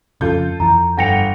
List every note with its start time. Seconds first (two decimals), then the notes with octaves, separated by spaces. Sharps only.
0.21 F2 C#3 F4 A4 G6
0.60 F2 E3 A#5
0.97 G1 F#5 G5 A#6 C#7 F7